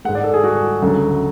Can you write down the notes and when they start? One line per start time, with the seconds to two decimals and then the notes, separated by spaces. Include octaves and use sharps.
0.05 G#3 F#5
0.09 G#2
0.15 D5
0.24 A4
0.34 G#4
0.44 F#4
0.82 D2 C#3 F#3 A3